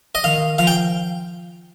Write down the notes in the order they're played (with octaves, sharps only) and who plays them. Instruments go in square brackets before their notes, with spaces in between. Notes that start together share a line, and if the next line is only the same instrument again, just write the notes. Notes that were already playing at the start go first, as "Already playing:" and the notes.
[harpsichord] D#5
[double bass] D#3 [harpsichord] F5
[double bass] F3 [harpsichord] F5
[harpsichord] G5